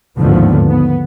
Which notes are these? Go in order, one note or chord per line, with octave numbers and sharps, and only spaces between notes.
G#1 D#2 A2 D3 F3 B3
B3